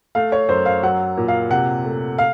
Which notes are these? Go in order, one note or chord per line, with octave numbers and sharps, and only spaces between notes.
A3 F5
C#5
F#2 C5
F5
F#3 F#5
A#2
F5
C3 F#5
A3
F5